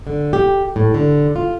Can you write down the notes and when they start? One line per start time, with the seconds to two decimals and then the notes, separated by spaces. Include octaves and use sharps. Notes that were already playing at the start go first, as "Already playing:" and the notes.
0.07 D3
0.33 G4
0.76 A2
0.94 D3
1.36 F4